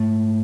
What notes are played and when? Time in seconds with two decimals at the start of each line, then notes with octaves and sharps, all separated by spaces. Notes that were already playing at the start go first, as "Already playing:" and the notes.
Already playing: G#2 A3